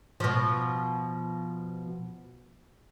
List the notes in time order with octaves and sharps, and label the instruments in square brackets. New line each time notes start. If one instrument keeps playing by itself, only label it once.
[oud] B2 F3